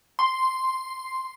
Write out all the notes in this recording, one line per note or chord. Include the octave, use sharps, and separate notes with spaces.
C6